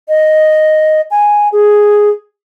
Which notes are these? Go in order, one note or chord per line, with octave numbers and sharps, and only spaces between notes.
D#5
G#5
G#4